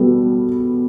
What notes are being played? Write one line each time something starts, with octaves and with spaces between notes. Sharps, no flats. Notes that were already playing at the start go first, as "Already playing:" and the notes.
Already playing: B2 G3 B3 F#4 A4